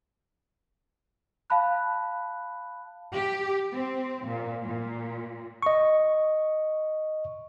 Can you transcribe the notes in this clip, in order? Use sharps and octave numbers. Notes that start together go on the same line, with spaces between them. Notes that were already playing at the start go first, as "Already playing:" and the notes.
F5 A5 B5 F#6
G4
C4
A#2
A#2
D#5 C#6